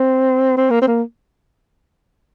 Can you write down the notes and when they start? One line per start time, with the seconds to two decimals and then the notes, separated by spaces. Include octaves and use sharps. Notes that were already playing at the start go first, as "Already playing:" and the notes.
Already playing: C4
0.57 C4
0.70 A#3
0.81 C4
0.87 A#3